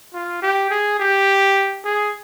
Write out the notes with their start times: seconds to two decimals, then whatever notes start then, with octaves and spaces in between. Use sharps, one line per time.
0.14 F4
0.42 G4
0.70 G#4
1.00 G4
1.85 G#4